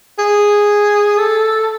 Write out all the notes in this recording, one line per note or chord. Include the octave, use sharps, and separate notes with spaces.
G#4
A4